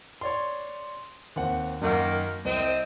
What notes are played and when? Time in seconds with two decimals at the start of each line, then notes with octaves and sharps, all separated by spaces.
0.21 C#5 D5 C6
1.36 D#2 C4 F#5
1.81 F#2 D#3 A#3 F#5
2.45 C2 C4 D#5